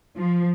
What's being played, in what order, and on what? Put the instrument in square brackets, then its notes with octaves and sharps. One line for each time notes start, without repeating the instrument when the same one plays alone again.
[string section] F3